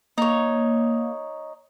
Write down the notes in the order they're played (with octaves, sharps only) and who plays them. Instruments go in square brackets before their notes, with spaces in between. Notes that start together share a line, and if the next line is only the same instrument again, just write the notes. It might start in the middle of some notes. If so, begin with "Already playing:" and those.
[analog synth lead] A#3 [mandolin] D#4 C#5